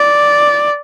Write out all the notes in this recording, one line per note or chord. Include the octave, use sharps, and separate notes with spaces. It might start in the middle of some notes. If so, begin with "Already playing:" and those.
Already playing: D5